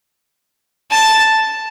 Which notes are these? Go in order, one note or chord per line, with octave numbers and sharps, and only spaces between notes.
A5